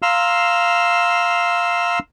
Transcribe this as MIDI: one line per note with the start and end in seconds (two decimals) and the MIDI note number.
0.02 1.99 77
0.02 1.99 82
0.02 1.99 84
0.02 1.99 88